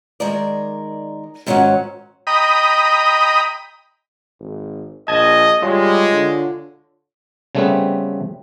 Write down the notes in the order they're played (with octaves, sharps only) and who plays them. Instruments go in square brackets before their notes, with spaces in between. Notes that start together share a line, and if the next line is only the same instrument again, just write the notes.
[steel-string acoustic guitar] D#3 G#3 A#4 D5
G#2 D#3 F#3 G#3 C#4 F#5
[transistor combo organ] D#5 G5 A#5 B5 D#6
[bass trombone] G#1
[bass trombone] A#1 [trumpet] D#5 [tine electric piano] A5 G#6
[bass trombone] G3 [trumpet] G#3 [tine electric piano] F4 C#5
[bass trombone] D3
[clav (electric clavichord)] C#3 G3 A3 B3 C4 B4